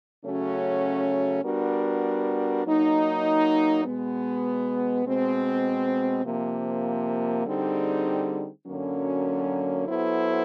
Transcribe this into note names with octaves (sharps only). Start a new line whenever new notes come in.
C#3 F#3 A3 C#4 F#4
G3 B3 D4 F#4 A#4
F#3 A#3 D#4
B2 G#3 B3
B2 G#3 C4
C3 F3 A#3
D3 G3 C4 D#4 G#4
F#2 D3 F#3 A#3 C#4
F#3 B3 E4 A4 C5